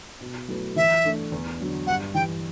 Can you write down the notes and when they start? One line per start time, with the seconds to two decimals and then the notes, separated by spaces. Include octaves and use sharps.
0.21 B2
0.48 F#3 A3 E4 B4
0.76 E3 E5
1.05 A3 D4
1.32 E2
1.60 D3 F#3
1.87 G2 F#5
2.15 E3 G3 G5